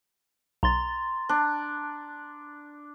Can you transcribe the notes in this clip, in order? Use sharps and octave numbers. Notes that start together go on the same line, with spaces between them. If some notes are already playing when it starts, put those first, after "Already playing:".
B1 A#5 C6 A6
D4